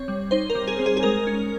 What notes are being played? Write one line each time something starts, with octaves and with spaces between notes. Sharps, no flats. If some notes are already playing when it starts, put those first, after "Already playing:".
Already playing: C4 C#5
G3
D#4 C5
A#4
G3
G#4
C4
G#4
G#4
G#3 A#4
C#4